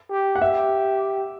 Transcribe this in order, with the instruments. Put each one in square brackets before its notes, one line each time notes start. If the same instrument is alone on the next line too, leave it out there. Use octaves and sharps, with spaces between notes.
[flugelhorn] G4
[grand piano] F#5
[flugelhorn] G4 [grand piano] E5